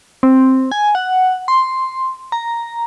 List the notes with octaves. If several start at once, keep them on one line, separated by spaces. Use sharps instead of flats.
C4
G#5
F#5
C6
A#5